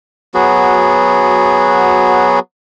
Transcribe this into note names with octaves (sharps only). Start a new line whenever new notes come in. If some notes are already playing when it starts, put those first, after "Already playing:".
F#3 B3 F#4 G#4